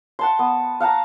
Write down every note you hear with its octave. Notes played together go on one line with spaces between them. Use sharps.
F#5 A5 C6
B3
F5 F#5 A5 A#5